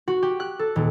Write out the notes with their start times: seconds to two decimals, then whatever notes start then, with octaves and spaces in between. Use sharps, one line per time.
0.08 F#4
0.23 G4
0.40 F#6
0.59 A4
0.76 D#1